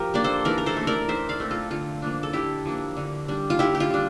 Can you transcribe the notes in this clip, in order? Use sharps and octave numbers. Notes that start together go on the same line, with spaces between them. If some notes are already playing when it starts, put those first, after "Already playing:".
Already playing: F3 G4 A#4
A#3 D4 D5
A4 C5
E3 A#4 D5
A#4
A4 C5
A3 C4
A#4 D5
E3 C5 E5
D5 F5
A3 C4
F4 A4
D3 F4
F3 A#3 D4
A4
D3 E4 G4
F3 A#3 D4
D3
G3 D4
F4
D3 E4 G4
G4
F4
G3 D4